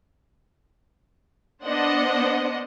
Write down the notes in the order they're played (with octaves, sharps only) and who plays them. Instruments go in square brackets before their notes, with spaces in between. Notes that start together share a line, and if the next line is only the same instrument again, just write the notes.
[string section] B3 D4 C5 D#5 F#5